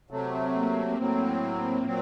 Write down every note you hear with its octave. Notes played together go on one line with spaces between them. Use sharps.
C3 F#3 A3 C4
A#3
A2 F#3 C4
A#2 F#3 C4